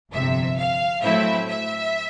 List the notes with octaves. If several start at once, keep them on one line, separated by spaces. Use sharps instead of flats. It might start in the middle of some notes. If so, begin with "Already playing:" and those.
G1 F2 C3 E5
F5
A2 F#3 A3 C4 E4 E5
E5